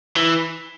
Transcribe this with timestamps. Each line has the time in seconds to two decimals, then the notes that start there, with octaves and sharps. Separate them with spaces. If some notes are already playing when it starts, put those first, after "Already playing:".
0.16 E3